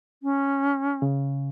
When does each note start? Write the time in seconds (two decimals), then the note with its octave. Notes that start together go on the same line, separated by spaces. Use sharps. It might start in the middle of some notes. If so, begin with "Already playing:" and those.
0.23 C#4
1.02 C#3